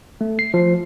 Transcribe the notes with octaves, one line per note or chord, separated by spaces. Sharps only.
A3
C7
F3